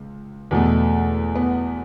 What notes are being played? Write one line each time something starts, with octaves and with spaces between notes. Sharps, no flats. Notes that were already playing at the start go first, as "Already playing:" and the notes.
Already playing: C#2
E2 B2 A3
B3